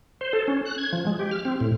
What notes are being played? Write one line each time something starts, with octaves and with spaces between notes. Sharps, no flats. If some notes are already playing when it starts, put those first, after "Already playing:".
C5
A4
C#4
F#6
G#6
F3
G#3
G4
F6
C4
A2